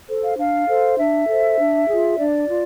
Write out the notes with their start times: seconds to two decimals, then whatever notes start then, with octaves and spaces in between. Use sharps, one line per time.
0.08 A4 C5
0.23 F5
0.38 D4 F5
0.68 A4 C5
0.98 D4 E5
1.28 A4 C5
1.58 D4
1.89 F4 G#4
2.18 D4 D5
2.49 F4